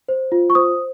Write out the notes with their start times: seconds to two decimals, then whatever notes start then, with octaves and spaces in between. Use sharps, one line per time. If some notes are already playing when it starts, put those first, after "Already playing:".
0.08 C5
0.32 F4
0.50 C#6
0.55 C5 D#6